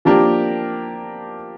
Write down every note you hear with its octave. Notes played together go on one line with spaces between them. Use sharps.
F3 A#3 D4 G4 A#4